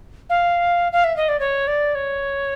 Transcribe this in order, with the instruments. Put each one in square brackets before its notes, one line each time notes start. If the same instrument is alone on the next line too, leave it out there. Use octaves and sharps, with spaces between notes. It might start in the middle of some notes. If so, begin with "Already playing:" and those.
[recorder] F5
F5
E5
D#5
D5
C#5
D5
C#5